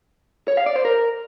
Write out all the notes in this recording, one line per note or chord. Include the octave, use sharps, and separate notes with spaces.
C#5
F5
D5
C5
A#4